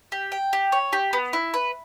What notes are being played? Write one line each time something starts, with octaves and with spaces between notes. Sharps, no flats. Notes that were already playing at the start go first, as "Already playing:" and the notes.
G4
G5
G4
C#5
G4
B3
E4
B4